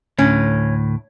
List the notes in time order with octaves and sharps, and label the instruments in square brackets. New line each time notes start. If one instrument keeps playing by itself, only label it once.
[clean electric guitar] D2 A2 [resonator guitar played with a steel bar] C#4